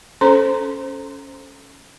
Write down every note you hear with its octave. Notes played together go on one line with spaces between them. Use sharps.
C#4 A4 C5 A#5 C6